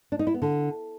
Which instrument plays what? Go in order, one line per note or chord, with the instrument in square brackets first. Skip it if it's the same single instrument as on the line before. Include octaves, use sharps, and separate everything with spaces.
[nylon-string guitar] D4
D#4
E4
B3
D3